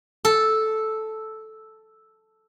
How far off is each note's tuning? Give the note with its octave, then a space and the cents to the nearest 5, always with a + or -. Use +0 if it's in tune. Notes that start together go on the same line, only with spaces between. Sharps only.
A4 -5